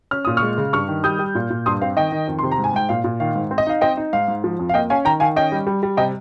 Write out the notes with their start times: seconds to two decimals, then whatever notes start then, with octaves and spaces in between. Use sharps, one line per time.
0.11 C#4 F6
0.25 A#2 D#6
0.37 C#6 F6
0.42 G#3
0.58 C#3
0.73 G2 C#6 F6
0.88 D#3
1.04 G3 D#6 G6
1.19 G3
1.35 A#2
1.50 A#2
1.66 G2 C6 D#6
1.81 C4 F5
1.97 D#3 D#5 G5
2.12 D#3
2.28 F2
2.39 C3 C6
2.51 A#5
2.58 G#2
2.64 G#5
2.73 G#2 G5
2.89 A#2 F5
3.04 A#2
3.20 D#3 F5
3.36 G#2
3.51 C4
3.58 D#5
3.67 D#4 F5
3.81 C4 D#5 G5
3.97 D#4
4.13 G#2 F5
4.28 G#2
4.44 F3
4.59 F2
4.69 F5
4.74 A#3 D#5 G5
4.90 C#4 F5 G#5
5.05 D#3 G5 A#5
5.20 D#3 F5 G#5
5.36 C#4 D#5 G5
5.52 G3
5.67 G3
5.83 G3
5.97 C3 D#5 G5